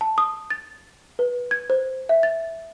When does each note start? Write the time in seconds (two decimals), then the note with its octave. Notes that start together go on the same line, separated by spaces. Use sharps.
0.01 A5
0.18 D#6
0.50 A6
1.19 B4
1.51 G#6
1.70 C5
2.09 E5
2.23 A6